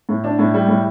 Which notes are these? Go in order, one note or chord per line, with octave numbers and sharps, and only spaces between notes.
A2
D4
A2
G3
A2